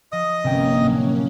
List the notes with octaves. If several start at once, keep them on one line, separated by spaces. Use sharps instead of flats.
F3 D#5 D#6
G1 C3 A#3 C#4 G5
A2 F#3